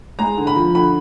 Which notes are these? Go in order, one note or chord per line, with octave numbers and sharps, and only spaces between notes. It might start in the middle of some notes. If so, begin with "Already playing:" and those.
G#3 A#5
D3
B5
F3
D3 B5